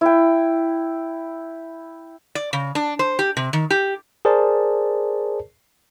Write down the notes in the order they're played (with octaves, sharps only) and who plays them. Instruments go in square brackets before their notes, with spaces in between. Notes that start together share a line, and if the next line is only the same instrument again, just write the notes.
[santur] E4 G5
[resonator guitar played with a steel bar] D5
C#3
D4
C5
G4
C3
D#3
G4
[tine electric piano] G#4 A#4 C5 D5 A5